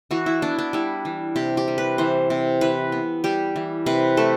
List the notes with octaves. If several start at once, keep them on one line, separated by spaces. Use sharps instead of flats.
E3 F#4
E4
B3 D4
D4
G3 E4
E3
C3 G4
G4
G3
B4
E3 C5
C3
E3 B4
B3
G3 G4
E3
C3 B4
A3 A4